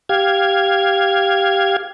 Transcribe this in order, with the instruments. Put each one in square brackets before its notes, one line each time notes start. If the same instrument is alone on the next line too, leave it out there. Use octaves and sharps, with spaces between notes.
[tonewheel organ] G4 F5 G#6